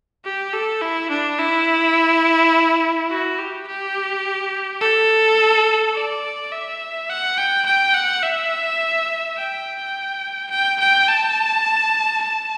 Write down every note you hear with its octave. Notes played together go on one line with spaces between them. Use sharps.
G4
A4
E4
D4
E4
F#4
G4
G4
A4
D5
E5
F#5
G5
G5
F#5
E5
G5
G5
G5
A5
A5